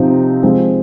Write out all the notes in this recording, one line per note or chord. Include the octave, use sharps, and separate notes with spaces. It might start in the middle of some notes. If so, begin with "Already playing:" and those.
Already playing: C3 F3 C4 D#4
F3 G#3 C4